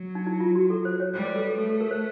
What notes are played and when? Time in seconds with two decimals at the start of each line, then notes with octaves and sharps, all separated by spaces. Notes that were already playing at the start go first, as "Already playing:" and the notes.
Already playing: F#3
0.15 D#4
0.27 E4
0.40 F4
0.55 F#4
0.70 A4
0.85 C5
1.00 C#5
1.14 G3 C5
1.25 B4
1.36 A4
1.47 A4
1.58 A3 A4
1.69 A4
1.81 A#4
1.91 C5